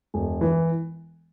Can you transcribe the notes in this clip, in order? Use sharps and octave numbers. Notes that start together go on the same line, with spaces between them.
E1
E3